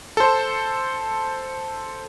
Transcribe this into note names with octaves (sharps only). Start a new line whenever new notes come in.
A4 C5